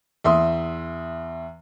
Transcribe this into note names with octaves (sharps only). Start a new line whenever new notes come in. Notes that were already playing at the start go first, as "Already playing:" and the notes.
E2 E5 C6 D#6